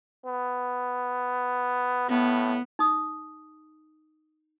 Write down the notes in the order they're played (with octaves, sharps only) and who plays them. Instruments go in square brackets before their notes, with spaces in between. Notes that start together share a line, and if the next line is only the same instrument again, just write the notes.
[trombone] B3
[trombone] A2 [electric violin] B3
[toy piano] D#4 D#6